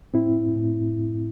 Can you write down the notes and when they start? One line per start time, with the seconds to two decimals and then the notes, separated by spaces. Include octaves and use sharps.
0.14 A2 C4 E4
0.56 A2